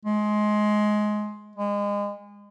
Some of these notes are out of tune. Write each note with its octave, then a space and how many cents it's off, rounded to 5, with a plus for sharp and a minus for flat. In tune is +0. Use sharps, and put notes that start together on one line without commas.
G#3 +20
G#3 -30